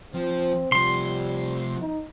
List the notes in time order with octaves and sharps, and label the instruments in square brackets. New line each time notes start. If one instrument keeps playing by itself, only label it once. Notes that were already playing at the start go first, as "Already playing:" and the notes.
[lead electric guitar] F3 [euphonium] C4
[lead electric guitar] C3 F3 [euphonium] G3 [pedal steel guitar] C6
[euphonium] D#4